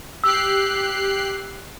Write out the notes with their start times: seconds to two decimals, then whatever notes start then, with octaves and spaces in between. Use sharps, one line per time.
0.24 G4 E6 F#6 C7